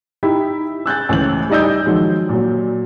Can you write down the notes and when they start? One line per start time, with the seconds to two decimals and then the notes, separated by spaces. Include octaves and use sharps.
0.23 D#4 E4 G4
0.86 E6 F#6 G6 A6
1.09 C#2 A2 E3 F#7
1.50 G3 D#4 D5 D#5 E6 G6
1.85 D#3 F3 F#3 G#3
2.29 A#2 F#3